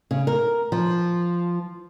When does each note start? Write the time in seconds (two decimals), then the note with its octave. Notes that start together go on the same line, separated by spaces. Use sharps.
0.11 C#3
0.27 A#4
0.72 F3